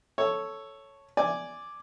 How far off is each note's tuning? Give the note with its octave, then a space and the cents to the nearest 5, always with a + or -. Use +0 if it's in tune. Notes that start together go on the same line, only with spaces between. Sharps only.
A4 +0 C#5 +0
D5 +0 G#5 +0